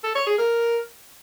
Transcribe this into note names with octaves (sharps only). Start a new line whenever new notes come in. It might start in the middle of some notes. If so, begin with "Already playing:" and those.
A4
C#5
G#4
A#4